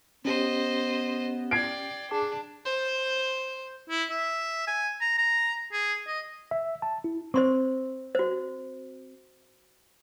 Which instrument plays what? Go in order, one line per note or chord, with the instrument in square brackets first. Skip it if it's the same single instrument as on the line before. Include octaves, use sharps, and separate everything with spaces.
[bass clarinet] B3 [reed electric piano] C#4 G4 [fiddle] C5 D#5
[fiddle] D5 G5 [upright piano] G#6 C7 D7
[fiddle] D4 [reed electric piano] G#4 A5 D6
[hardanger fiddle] C5
[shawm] E4
E5
G#5
A#5
A#5
G#4
D#5
[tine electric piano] E5
A5
E4
[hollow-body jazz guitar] C4 [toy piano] C5 C6 C#6
[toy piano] F#4 C5